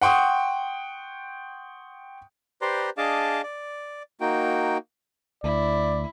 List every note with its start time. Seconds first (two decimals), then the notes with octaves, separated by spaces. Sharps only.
0.02 F#5 G5 C6 C#6 D#6
2.62 G4 B4 C5 D5 A#5 C6
2.98 D4 G#4 D#5 F5 A5 D6
3.43 D5
4.21 A#3 D#4 F#4 G5
5.44 D2 E4 D5